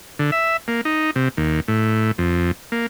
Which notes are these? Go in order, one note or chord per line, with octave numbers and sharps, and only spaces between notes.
D3
E5
A#3
D#4
C3
D#2
A2
F2
A#3